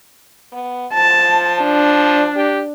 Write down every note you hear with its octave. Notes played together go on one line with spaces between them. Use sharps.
B3
F3 A5
D4
G4